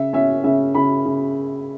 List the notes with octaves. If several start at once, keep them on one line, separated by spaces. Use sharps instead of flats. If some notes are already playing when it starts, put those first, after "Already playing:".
Already playing: C#3 E5
C#4 E5
C#3 E5
C#3 B5
C#3